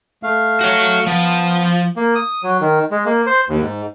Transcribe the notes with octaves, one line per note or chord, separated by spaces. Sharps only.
A3 F5
F#4 C#5
F3 B3
A#3
D#6
F#3
D#3
G#3
A#3
C5
D#2
G#2